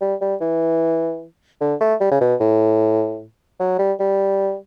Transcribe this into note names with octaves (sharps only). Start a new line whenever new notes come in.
G3
G3
E3
D3
A3
G3
C#3
B2
A2
F#3
G3
G3